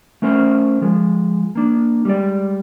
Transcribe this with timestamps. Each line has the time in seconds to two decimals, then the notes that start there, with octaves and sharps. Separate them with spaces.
0.22 A3 C#4 A#4 C5
0.82 F3 G#3
1.55 A#3 D4
2.05 G3 G#3 D5